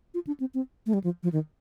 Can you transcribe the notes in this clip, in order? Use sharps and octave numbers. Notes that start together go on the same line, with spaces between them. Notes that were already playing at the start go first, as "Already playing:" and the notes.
F4
D4
C4
C4
A3
G3
F3
F3
D#3